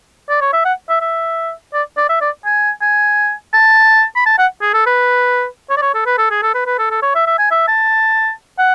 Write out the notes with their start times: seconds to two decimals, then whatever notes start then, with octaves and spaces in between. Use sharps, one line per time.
0.29 D5
0.41 C#5
0.53 E5
0.65 F#5
0.89 E5
1.01 E5
1.74 D5
1.97 D5
2.09 E5
2.21 D5
2.45 G#5
2.81 G#5
3.53 A5
4.16 B5
4.26 A5
4.38 F#5
4.61 G#4
4.74 A4
4.86 B4
5.70 C#5
5.77 D5
5.82 C#5
5.94 A4
6.06 B4
6.18 A4
6.30 G#4
6.42 A4
6.54 B4
6.66 B4
6.78 A4
6.91 A4
7.02 C#5
7.15 E5
7.27 E5
7.39 G#5
7.51 E5
7.68 A5
8.58 F#5